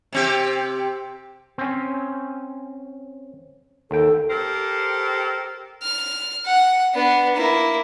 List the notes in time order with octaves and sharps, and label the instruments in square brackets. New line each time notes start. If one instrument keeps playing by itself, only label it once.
[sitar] C3 C4 G4
[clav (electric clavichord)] C4 C#4
[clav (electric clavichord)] D#2 G5 [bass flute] A4
[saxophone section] G4 A4 A#4 C5
[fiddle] F6
F#5
B3 D4
A#3 E4